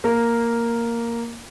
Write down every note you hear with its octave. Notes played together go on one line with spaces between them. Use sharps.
A#3